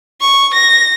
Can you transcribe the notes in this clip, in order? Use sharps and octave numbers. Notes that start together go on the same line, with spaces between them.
C#6
A#6